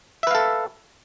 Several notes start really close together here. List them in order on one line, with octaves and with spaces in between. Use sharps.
E5 B4 F5 A4